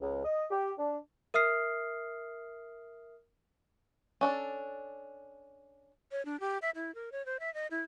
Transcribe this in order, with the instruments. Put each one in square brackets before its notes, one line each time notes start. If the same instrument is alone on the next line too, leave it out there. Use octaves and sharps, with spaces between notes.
[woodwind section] C#2
D#5
G4
D4
[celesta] A#4 E5 D#6 F6 C7
[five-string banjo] C#4 D4 A4
[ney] C#5
D4
G4
E5
E4
A#4
C#5
C5
E5
D#5
E4